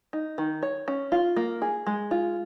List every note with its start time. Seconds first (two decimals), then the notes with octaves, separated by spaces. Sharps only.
0.13 D#4
0.38 D#3
0.63 C#5
0.88 C#4
1.12 F4
1.36 A#3
1.62 G#4
1.87 G#3
2.11 F4